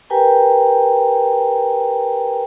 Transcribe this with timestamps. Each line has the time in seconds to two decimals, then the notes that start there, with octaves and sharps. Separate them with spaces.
0.10 G4 A#4 B4 G5 G#5 A#5